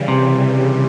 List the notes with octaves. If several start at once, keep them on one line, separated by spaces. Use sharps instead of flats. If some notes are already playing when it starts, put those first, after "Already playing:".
Already playing: C#3 E3 G3
C3